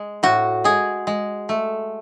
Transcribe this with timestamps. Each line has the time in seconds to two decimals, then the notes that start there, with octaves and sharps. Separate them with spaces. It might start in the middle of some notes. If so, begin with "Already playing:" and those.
Already playing: G#3
0.23 A2 F#4
0.64 G#3 G#4
1.07 G#3
1.49 A3